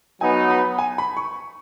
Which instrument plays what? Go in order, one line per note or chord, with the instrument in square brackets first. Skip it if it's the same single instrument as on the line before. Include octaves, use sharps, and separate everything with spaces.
[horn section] F#3 B3 D#4 [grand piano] G#5
[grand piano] B5
G#5
B5
C#6